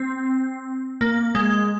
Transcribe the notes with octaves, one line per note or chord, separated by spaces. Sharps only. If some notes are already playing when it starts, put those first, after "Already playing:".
Already playing: C4
A#3
G#3